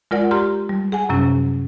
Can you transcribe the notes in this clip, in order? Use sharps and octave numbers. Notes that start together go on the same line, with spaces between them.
G#3 F4 A#4 D5 F#5
G4 A#5 C6 F6
G3
G#4 F#5 G#5
F#2 C3 F#3 C#4